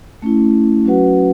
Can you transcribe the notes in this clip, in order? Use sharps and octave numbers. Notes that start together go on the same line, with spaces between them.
A3 C#4 E4
F#3 C#4 F#4 B4 F#5